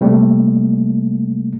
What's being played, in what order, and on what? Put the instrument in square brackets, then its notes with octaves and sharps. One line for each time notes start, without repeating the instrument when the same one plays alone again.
[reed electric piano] C3 G3 A3 A#3